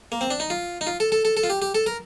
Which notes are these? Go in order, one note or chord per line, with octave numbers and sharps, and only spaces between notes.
A#3
C4
D4
D#4
F4
D#4
F4
A4
A4
A4
A4
F4
G4
G4
A4
A#4